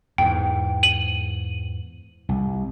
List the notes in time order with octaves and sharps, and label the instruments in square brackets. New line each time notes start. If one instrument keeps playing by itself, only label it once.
[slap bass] E2 G#2 [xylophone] G5
[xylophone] D#7 F#7
[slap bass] C2